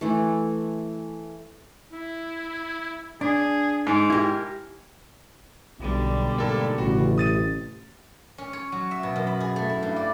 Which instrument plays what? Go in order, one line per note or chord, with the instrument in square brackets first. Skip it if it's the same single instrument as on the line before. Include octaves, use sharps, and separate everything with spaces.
[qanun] E3 A3
[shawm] E4
[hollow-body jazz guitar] D4 [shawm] G#4
[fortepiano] G#2 [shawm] D6
[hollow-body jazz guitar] E4 G4 [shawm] A#4
[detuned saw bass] B1 [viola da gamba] B2 D3 G3
[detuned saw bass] G#2 [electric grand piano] A#3 A4
[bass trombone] A1 [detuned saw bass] C#3 [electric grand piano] F#4
[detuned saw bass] C3 [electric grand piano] D#6 A6 D#7
[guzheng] C#4
C#5
F#3
E5
B2
F#2
B5
G#4
A3
E4
G2
D5